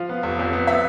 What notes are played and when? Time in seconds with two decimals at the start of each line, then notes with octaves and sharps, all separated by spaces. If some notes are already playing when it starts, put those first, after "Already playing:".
Already playing: F3 F5
0.09 B3
0.23 F1
0.39 F2
0.53 B3
0.67 B3 E5